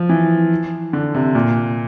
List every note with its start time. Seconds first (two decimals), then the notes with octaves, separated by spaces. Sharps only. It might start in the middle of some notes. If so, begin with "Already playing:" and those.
Already playing: F3
0.09 E3
0.93 D3
1.15 C3
1.35 A#2